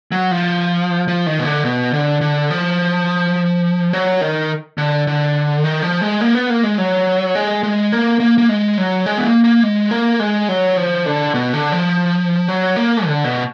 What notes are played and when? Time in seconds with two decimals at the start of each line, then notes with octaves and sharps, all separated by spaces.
0.12 F#3
0.31 F3
1.08 F3
1.26 D#3
1.39 B2
1.45 D3
1.65 B2
1.94 D3
2.21 D3
2.51 F3
3.93 F#3
4.21 D#3
4.78 D3
5.07 D3
5.64 D#3
5.82 F3
6.01 G#3
6.21 A#3
6.35 B3
6.50 A#3
6.63 G#3
6.78 F#3
7.35 G#3
7.63 G#3
7.92 A#3
8.20 A#3
8.38 A#3
8.49 G#3
8.78 F#3
9.06 G#3
9.18 B3
9.25 A#3
9.44 A#3
9.63 G#3
9.91 A#3
10.20 G#3
10.48 F#3
10.77 F3
11.06 D3
11.34 B2
11.53 D3
11.72 F3
12.48 F#3
12.76 A#3
13.06 D3
13.24 B2